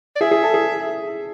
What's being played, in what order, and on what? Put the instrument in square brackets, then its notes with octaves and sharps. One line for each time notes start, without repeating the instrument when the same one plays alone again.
[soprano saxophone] D5
[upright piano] G#4 [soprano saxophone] E5
[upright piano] G#4
A4
G#4